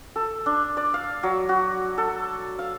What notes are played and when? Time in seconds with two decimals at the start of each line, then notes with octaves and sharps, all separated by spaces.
0.16 A4
0.46 D4
0.77 D5
0.94 F5
1.23 F#3
1.49 F#4
1.98 A4
2.59 F5